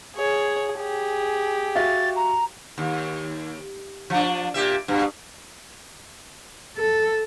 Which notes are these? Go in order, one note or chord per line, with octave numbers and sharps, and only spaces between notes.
G#4 C#5
G4 G#4
F#4 E5 F5 A6
A#5
D#2
F3 D4
A#2 G4 E5
G2 B2
A4